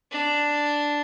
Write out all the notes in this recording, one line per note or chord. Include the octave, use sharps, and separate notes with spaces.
D4